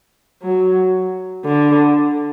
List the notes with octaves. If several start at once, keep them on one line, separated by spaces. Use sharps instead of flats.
F#3
D3